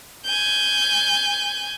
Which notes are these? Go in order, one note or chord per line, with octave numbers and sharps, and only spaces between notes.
G#5 G6